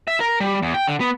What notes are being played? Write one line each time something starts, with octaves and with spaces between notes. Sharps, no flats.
E5
A#4
G3
E2
G5
D3
B3